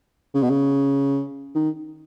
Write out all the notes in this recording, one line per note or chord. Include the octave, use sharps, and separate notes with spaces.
C#3
B2
C#3
D#3